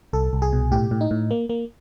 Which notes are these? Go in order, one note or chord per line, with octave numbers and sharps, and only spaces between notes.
C2 A4
C2
G#4
B2
A2 G4
A2
D#4
A2
A#3
A#3